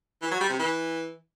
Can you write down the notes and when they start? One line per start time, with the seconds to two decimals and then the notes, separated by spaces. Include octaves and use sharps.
0.22 E3
0.31 F#3
0.41 G3
0.50 C3
0.59 E3